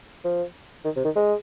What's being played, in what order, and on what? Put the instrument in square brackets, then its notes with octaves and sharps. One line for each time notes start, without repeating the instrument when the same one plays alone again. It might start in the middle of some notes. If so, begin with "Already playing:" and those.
[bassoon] F3
D#3
C3
D#3
G#3